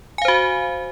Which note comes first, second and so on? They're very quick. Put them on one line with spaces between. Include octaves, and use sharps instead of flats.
G#5 F5 C5 F#4